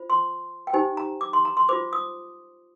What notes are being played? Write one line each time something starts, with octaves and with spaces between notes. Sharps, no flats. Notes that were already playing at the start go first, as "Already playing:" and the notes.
Already playing: F4 C5
C6
G5
D#4 G4 C5 G#5
A#5
D6
C6
A#5
C6
F4 C5 D6
D#6